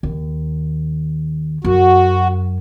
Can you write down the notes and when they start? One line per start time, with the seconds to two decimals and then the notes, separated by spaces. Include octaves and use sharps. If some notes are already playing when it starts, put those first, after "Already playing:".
0.03 D#2
1.65 F#2 F#4